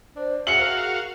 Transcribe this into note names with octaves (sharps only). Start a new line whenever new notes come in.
D4 C5
F#4 G#4 E5 F5 C#7 F#7
A#4